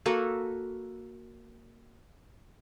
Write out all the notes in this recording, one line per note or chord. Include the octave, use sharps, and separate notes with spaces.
A#3 F#4 A4 B4